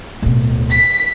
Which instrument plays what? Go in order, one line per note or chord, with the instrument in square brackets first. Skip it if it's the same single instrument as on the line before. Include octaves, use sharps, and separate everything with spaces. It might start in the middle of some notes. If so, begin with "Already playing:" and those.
[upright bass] D1 B2
[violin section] B6